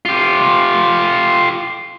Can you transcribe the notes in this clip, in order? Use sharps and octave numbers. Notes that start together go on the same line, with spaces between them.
F4 G4